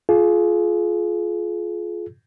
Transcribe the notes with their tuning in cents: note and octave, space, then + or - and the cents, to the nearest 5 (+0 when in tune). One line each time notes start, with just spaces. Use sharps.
F4 +0 G#4 +35